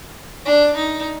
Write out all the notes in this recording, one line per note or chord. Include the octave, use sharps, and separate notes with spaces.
D4
D#4